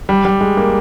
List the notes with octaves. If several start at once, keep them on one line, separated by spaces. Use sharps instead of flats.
G3
G3
G#3
A#3